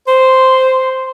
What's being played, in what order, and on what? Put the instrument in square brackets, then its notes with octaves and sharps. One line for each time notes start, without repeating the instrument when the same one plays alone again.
[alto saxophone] C5 [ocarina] C6